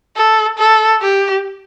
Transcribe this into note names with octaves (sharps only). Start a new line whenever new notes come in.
A4
A4
G4